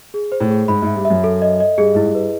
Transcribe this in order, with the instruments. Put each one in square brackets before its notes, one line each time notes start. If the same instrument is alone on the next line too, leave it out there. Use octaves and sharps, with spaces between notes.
[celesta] G#4
C5
[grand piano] A2
[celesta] G#4
[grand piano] G#2 [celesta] B5
[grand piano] G#2 [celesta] E5
[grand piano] G2
[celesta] E5
[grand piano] F#2
[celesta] A4
D#5
D#5
[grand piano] G2 [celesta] G#4
[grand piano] G#2 [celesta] E4
[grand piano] G2
[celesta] B4